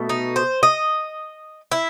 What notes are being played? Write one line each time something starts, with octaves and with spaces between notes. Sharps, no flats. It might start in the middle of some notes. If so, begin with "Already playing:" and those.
Already playing: B2 A3
D#4
C5
D#5
E4